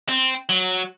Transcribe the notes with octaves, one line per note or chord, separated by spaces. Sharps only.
C4
F#3